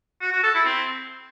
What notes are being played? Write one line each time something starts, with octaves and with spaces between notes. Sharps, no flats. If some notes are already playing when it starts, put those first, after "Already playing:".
F#4
F#4
A4
E4
C4